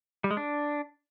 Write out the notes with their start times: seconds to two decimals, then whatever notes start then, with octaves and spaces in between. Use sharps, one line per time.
0.24 G3
0.31 G#3
0.37 D4